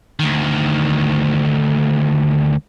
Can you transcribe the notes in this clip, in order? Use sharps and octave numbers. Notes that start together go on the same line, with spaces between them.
D2 D#3